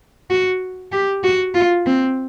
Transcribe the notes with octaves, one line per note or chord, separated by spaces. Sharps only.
F#4
G4
F#4
F4
C4